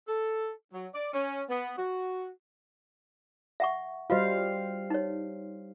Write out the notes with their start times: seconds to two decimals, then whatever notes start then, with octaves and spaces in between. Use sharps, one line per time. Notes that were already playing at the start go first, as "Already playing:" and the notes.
0.08 A4
0.73 F#3
0.94 D5
1.13 C#4
1.49 B3
1.77 F#4
3.60 E5 F#5 C#6
4.10 G3 F4 F#4 C5 D#5 F5
4.90 D#4 C#5